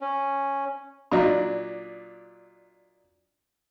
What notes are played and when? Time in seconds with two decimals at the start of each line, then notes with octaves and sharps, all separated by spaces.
0.01 C#4
1.12 A#2 F#3 D4 D#4